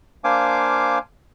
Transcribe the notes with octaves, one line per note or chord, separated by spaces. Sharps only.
A#3 D4 C5 F5 G#5 D6